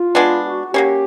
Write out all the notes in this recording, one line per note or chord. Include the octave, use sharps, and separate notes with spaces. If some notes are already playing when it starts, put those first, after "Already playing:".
Already playing: F4
G#3 B3 D4
F#4
F#3 A#3 C#4 G4